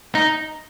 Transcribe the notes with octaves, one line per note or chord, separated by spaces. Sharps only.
D#4